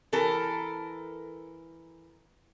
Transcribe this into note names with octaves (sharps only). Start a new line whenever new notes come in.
E3 A4 A#4